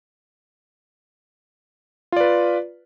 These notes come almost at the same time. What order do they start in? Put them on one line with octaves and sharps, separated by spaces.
F4 D5 B4